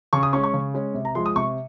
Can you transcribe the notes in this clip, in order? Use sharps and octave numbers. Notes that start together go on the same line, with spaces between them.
C#3 C#6
D#6
G#3 C#4 C#6
C#6
C#3
G#3 C#4
C3
A#5
F3 G#3 C6
D#6
C3 C#6